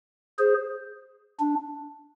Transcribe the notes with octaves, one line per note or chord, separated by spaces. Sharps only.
G#4 C5
D4